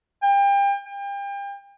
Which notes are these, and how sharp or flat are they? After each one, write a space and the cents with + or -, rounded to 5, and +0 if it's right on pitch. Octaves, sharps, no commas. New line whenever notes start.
G5 +35
G5 +35